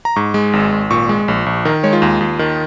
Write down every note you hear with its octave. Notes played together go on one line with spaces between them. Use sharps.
A#5
G#2 C#6
G#3
G#1
G#1
A#2 C#6
G#3
A#1
A#1
D#3 A#4
G#3 C#5
F4
D#2
D#2
D#3